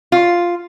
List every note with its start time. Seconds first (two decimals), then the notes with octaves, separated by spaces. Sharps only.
0.12 F4